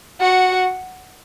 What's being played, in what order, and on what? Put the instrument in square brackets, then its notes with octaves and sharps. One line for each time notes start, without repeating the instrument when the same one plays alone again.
[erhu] F#4 [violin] F#5